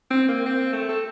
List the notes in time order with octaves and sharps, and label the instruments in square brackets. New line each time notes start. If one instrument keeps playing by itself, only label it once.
[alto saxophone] C4
A#3
C4
A3
A4